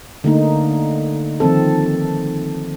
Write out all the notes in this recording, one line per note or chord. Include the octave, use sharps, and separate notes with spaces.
D3 A3 A#3 D#4
D#3 F3 C4 A4